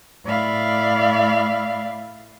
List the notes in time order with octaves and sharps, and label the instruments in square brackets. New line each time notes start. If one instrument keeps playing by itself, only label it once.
[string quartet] A2 D5 E5 F5 B5